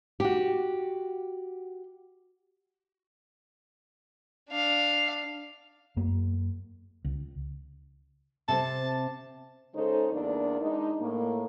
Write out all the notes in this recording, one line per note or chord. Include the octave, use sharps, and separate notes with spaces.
F#4 G4
D4 F5
F#2 A#3
C#2
C3 C4 A5
C#3 G#3 D#4 A4 C5
E2 A#3 D4 A#4
G#3 D4 D#4
A2 A#3